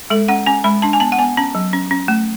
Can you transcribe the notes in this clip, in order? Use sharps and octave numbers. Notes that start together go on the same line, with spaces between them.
G#3 A4
C#4 F#5
C#4 G#5
G#3 B5
D4 A5
G#5
B3 A5
F#5
B3 G#5
C#4 A5
F#3
C#4
C#4
A3